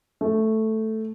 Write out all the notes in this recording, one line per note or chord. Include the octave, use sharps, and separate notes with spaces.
A3